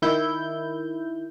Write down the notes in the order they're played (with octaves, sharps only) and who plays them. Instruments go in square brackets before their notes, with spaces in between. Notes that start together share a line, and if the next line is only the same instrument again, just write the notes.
[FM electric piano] D#3 E4 G6